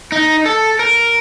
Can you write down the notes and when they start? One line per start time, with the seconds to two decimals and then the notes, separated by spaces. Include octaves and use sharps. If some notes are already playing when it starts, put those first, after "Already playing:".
0.12 D#4
0.46 A4
0.79 A#4